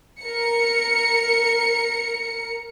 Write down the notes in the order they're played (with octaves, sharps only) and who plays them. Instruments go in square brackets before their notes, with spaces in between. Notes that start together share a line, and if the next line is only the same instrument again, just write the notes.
[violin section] A#4 C#7